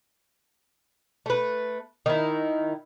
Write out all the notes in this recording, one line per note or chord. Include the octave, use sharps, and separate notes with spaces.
A3 B4
D#3 E4